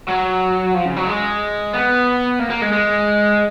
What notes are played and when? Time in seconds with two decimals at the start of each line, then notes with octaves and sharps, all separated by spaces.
0.08 F#3
0.74 F3
0.85 C#3
0.96 F#3
1.07 G#3
1.73 B3
2.39 A#3
2.50 A#3
2.62 G#3
2.73 G#3